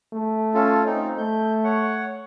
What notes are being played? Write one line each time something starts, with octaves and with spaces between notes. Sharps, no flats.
A3
C#4 F4 A4
C4 D#4
A3 G6
C#5 F#5